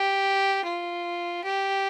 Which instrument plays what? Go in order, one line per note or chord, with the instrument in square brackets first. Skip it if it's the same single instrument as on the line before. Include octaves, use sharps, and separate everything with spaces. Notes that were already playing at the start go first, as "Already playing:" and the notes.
Already playing: [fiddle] G4
F4
G4